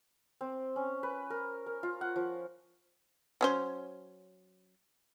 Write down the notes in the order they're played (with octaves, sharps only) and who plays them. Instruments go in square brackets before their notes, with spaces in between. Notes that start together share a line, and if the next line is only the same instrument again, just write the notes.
[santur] C4
C#4
B4
A#4
A#4
F4
F#5
F3
[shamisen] F#3 C#4 C5